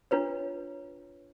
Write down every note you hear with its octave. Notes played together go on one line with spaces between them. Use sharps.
D4 F4 B4 C#5